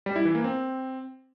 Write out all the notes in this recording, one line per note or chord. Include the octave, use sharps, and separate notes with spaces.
G3
E4
E3
A#3
C4